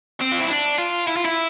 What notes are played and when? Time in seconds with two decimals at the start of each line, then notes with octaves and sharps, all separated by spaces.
0.21 C4
0.32 F4
0.41 E4
0.50 D4
0.78 F4
1.07 E4
1.16 F4
1.25 E4